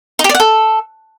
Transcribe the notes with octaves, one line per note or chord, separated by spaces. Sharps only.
D#4
G4
D5
F#5
A4